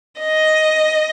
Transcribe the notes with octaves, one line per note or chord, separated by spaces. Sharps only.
D#5